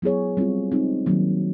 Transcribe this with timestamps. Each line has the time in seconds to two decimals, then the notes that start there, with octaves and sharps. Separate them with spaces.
0.02 F#3 B3 E4 G#4 C#5
0.37 G3 C4 F4
0.72 G#3 C4 D#4
1.06 D#3 F#3 A#3